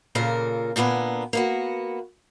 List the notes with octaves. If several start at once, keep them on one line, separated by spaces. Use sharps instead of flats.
A#2 C#3 A#3 F4 A4 A#4
A#2 D3 A#3 B3 G#5
A#3 B3 F#4